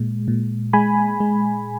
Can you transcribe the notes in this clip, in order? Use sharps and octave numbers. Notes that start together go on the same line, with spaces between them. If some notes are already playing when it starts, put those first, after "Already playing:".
Already playing: A#2 G#3
A#2
G#3 G#5 B5
G#3